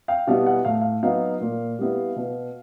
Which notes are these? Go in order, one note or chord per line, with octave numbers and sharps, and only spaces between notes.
F5 G5
B2 G3 B3 E4 F5
F#5
A2 F5
F5
F#3 B3 D#4 F5
A#2
G3 B3 E4
B2